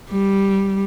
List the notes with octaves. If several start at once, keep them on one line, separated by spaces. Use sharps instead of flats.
G3